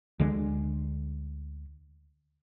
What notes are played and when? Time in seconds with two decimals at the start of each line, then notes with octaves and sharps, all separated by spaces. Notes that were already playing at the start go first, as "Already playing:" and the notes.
0.20 D2 D3 G#3